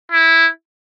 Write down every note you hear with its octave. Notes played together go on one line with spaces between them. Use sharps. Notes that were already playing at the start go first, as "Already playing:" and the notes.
E4